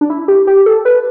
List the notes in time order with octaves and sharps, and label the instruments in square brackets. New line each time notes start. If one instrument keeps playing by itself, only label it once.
[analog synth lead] D4
E4
G4
G4
A4
B4